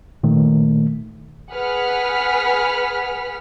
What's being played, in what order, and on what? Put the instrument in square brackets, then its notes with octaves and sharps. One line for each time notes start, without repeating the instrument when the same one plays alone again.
[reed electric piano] A#2 D#3 A3
[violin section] G#4 B4 F#5 F6 B6